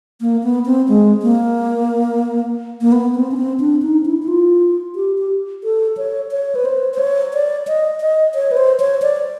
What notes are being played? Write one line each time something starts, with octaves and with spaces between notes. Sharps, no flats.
A#3
B3
C4
G#3
A#3
A#3
B3
C4
C#4
C4
D4
D#4
E4
E4
F4
G4
G4
A4
C#5
C#5
B4
C5
C5
C#5
D5
D#5
D#5
C#5
B4
C5
C#5
D5